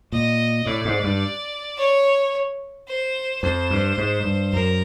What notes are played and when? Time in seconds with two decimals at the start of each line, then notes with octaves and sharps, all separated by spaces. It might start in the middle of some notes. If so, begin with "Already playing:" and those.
0.12 A#2 D#5
0.66 A2 D5
0.85 G#2
1.04 G2
1.77 C#5
2.87 C5
3.42 F2 C5
3.70 G2
3.98 G#2
4.24 G2
4.53 F#2 A#4